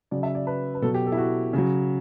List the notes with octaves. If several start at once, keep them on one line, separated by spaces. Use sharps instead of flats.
C#3 F#3 D5
E5
D5
B4
B4
B2 F#3 A4
G4
A4
E4
F#4
C#3 F#3